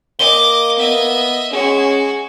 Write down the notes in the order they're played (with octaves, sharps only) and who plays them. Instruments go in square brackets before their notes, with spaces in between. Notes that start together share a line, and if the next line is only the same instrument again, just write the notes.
[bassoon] A#3 [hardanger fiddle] D#5 D6 [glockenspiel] G7
[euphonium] B3 [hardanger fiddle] D#5 E5
[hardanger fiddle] G#3 F#4 [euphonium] C#4 [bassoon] G#4